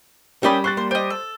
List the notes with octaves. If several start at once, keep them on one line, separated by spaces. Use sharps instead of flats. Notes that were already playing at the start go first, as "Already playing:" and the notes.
G3 C#4 A#4 D5 E5 G5 B5 D#6
C5 C#6 F#6 A6
A#3 C5
G4 C5 D#5
A4